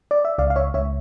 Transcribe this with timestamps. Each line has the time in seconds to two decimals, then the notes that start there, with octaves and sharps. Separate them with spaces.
0.11 D5
0.25 E5
0.38 C#2 D5 F5
0.50 F5
0.56 C#5 E5
0.74 C#2 C#5 E5